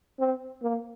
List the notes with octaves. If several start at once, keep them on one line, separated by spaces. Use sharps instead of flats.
C4
A#3